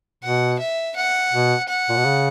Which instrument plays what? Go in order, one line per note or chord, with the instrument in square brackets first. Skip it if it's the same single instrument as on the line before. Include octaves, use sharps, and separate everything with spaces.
[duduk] B2 [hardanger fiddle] F#5
[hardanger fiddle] E5
F#5
[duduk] B2
[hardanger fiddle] F#5
[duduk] A#2
B2
C#3